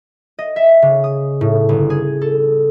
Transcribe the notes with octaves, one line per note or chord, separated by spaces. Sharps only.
D#5
E5
C#3
D#6
A2
G1
G#4
A4